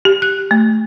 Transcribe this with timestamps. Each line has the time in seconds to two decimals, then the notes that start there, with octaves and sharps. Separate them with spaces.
0.05 G4
0.22 F#6
0.51 A3